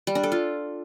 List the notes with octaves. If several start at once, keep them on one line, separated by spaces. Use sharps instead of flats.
G3
D4
A4
F4